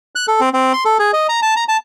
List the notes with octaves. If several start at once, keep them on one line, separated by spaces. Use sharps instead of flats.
F#6
A4
C4
C4
C6
A4
G#4
D#5
A#5
A5
A#5
A5